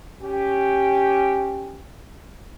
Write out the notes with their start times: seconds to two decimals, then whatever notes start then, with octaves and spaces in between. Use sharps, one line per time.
0.22 C#4 G4